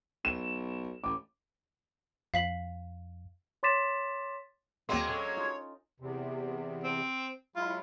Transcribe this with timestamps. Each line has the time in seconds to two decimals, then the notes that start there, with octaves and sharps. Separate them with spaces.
0.25 B1 E7
1.04 A1 D6
2.34 F2 F5 B6 F#7
3.63 C#5 C6 D6 A6 B6 E7
4.89 D#2 F#3 G#3 A#3 C4 D5 C6
5.08 C#4 D4 A4 C#5
5.37 D#4 F4
6.00 E2 C3
6.84 C4
7.56 F#3 G#3 E4 F4